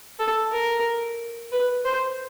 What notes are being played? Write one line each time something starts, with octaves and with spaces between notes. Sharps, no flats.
A4
A#4
B4
C5